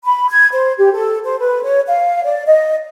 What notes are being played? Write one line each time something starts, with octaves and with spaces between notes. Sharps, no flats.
B5
G#6
C5
G4
A4
C5
B4
C#5
F5
D5
D#5